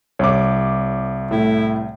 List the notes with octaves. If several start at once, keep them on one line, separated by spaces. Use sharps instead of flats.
C2 C#5 D6
A2 E4